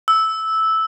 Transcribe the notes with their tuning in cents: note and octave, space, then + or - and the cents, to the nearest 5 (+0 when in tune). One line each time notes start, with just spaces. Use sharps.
E6 -10